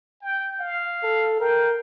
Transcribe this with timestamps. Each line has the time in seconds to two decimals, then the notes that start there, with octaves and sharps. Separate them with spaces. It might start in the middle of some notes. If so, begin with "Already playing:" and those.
0.22 G5
0.60 F5
1.03 A4
1.40 A#4 G5